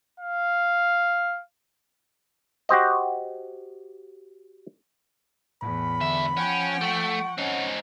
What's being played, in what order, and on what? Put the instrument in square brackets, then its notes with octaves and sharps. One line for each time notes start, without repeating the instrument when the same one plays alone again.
[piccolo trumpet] F5
[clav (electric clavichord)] F#4 G4 C5 D#5
[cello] E2 [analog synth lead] A2 [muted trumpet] B5
[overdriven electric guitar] G#2 E5 [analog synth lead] D3
[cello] F3 G5 [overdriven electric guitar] C#4 [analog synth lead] F#5
[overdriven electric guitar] A3 [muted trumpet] C#6
[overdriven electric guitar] C4 D#4 [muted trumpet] C#4